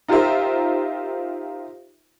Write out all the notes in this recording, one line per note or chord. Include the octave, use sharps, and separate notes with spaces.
D#4 F4 G4 A#4 C5 E5